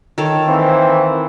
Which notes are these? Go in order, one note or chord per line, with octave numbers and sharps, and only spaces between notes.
D#3 A4 C#5
E3 A#3 C4